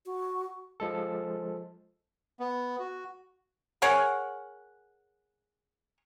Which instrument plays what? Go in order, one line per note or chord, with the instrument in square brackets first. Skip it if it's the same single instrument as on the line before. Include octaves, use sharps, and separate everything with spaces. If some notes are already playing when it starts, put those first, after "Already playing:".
[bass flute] F#4
[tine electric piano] F3 G#3 A4
[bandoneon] B3
F#4
[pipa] G#4 A#4 C#5 F#5